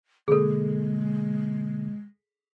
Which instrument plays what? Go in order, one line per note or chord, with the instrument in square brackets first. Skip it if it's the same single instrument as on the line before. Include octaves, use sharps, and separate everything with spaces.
[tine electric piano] B2 D3 A#3 [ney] G#3 [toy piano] G#4 A4